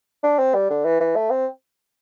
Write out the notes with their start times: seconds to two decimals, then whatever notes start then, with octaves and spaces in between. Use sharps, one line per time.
0.24 D4
0.38 C4
0.54 G3
0.70 D3
0.85 E3
1.00 E3
1.16 A3
1.30 C4